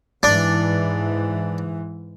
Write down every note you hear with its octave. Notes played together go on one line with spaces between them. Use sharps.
G#2 E3 D4